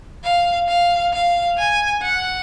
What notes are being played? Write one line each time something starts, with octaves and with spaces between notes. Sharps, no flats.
F5
F5
F5
G#5
F#5